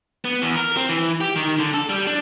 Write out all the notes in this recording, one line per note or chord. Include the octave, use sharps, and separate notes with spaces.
B3
E2
A#4
C4
E3
G4
D#3
D3
A4
G3
D4